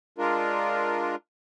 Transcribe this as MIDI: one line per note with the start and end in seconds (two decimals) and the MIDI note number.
0.18 1.15 56
0.18 1.15 62
0.18 1.15 65
0.18 1.15 70